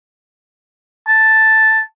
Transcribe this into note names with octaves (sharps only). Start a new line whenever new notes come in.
A5